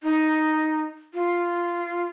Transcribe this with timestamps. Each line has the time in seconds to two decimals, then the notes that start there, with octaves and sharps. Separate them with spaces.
0.03 D#4
1.14 F4